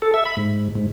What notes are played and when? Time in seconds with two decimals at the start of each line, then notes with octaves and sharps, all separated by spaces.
0.02 A4
0.14 E5
0.25 B5
0.37 G#2
0.75 G#2